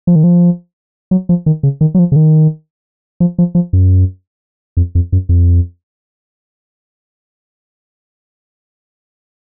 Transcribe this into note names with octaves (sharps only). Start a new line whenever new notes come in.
F3
D#3
F3
F#3
F3
D#3
C#3
D#3
F#3
F3
C#3
D#3
F3
F3
F3
F#2
F2
F2
F#2
F2